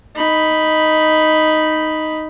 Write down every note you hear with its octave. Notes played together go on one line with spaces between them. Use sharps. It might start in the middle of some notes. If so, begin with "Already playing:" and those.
D#4 B5